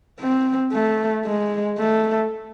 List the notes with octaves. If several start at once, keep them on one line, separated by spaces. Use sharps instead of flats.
C4
A3
G#3
A3